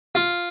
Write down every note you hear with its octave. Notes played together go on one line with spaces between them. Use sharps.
F4